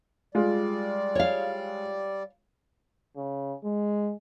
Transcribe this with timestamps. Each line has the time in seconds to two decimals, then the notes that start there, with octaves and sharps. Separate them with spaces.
0.35 G3 G#3 F4 D5
1.15 C#5 F5
3.17 C#3
3.64 G#3